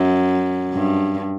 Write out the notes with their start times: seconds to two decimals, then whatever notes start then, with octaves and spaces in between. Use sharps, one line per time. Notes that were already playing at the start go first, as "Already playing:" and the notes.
Already playing: F#2
0.73 G2